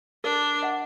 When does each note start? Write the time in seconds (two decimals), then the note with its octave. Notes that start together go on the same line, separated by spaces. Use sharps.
0.24 D4 A#4
0.63 D#5 F#5